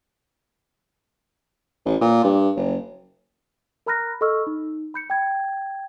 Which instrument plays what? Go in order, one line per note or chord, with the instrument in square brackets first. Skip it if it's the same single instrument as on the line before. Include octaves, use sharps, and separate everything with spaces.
[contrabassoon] A1
A#2
G2
F#1
[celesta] A#4 A#5 B5 F6 F#6 A#6
A4 D#5 B5 C#6 E6 F6
D#4
B5 G6 C#7
G5 G#6